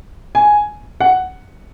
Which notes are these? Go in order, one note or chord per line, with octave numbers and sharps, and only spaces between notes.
G#5
F#5